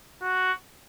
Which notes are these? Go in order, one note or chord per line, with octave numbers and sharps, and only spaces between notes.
F#4